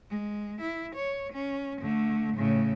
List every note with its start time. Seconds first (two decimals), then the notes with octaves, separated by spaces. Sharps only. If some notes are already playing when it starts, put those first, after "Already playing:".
0.10 G#3
0.61 E4
0.95 C#5
1.33 C#4
1.81 D3 A3
2.37 A2 C#3